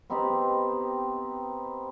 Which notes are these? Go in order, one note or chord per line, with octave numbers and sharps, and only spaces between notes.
B3 C4 D#4 G4